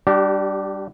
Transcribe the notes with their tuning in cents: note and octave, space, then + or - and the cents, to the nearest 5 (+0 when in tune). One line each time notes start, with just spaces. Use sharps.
G3 +0 D4 +0 G4 -35